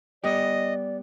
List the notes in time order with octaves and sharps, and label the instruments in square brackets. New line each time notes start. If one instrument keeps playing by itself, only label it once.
[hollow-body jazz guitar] G3 B3 G4 [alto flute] D5 [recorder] D#5